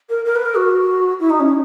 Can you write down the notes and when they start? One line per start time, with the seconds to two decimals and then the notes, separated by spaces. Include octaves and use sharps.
0.09 A#4
0.24 A#4
0.35 B4
0.45 A#4
0.56 F#4
1.19 E4
1.29 D#4
1.39 C#4